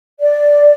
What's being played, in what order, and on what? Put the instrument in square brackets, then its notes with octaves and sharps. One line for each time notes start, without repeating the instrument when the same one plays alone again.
[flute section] D5